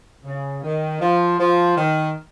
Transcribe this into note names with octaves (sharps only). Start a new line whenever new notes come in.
C#3
D#3
F3
F3
D#3